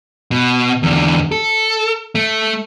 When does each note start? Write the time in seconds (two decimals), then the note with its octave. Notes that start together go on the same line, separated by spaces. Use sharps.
0.31 B2
0.83 E2 D3
1.32 A4
2.15 A3